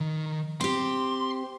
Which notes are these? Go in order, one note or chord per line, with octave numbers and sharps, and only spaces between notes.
D#3
C4 G4 C6